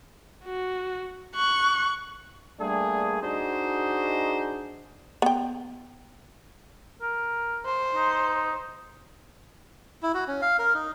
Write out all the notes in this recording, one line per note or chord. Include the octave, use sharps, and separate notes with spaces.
F#4
C#6 F#6
G3 A3 A#3 D4 G#4
D4 D#4 F#4 G#4 C5 D#5
B3 G5
A#4
C5
D#4
E4
F#4
C#4
F5
A#4
D#4